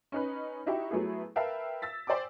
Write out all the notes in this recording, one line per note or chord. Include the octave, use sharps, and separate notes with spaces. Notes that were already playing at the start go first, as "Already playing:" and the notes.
C#4 D#4 B4
D#4 E4 F#4 G4 E5
F#3 A3 B3 E4 G#4
A#4 B4 E5 F5 G5 A5
E6 A6 B6
C5 D5 G5 G#5 D6